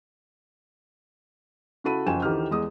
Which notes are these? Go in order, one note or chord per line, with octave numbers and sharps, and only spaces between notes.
C#3 E4 F#4 A4 B5 D#7
F#1 F3 G5 G#5 E7
D2 D#3 E3 G4 F6
E2 G#3 D#6